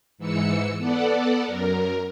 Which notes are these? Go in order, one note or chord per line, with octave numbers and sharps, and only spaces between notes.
G#2 E3 E6 C#7
B3 A4 D5 F#5
F#2 A#4